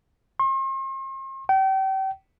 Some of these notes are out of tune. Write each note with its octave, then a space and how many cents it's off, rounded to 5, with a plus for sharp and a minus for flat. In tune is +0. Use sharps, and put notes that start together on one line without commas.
C6 +45
G5 -35